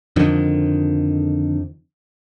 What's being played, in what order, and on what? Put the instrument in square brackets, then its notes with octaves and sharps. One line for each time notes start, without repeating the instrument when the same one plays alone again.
[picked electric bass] F2 D3 D#3 F3